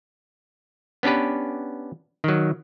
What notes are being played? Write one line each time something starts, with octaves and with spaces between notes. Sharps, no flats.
B3 C#4 D4 G4 B4
D#3 F#3